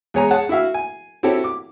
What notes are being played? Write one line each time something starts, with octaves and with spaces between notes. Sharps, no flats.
E2 G#3 C#5 G#5 A#5
G#4 C#5 F#5 A5
E4 F#4 E5 F5
G#5
C4 E4 F#4 G4 A4 C#5
D6